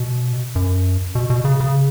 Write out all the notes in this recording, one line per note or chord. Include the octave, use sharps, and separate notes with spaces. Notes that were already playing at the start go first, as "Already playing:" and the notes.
Already playing: B2
F#2
B2
B2
C#3
C#3